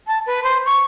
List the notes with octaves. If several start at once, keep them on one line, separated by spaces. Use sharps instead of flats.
A5
B4
C5
C#6